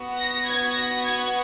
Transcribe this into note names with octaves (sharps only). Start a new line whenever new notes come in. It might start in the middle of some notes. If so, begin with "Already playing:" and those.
Already playing: B3 F#4
A#6
G#6
A#6
G#6